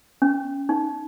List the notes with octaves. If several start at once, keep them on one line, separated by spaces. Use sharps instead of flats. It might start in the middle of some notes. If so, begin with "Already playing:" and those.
C#4
D#4